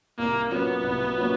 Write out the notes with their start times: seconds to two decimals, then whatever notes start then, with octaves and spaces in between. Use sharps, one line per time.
0.18 C2 A#3
0.51 A#2 F#3 A#3 B3 C#4
0.84 C2
1.16 A#2 F#3 A#3 C#4